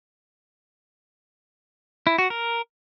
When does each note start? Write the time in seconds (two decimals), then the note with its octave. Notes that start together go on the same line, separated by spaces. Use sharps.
2.07 E4
2.18 F#4
2.30 A#4